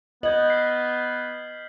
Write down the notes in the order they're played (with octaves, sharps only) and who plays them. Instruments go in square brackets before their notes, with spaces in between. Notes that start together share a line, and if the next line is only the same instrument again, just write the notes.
[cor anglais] B3 [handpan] D#5 [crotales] G6 G#6 F#7
[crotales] F6 B6 C7